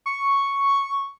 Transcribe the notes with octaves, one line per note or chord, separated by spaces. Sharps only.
C#6